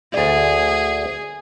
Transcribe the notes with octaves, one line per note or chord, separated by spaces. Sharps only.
D2 G#4 D5